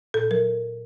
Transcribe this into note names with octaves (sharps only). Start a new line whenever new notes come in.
A#2 A4
F#3 A#4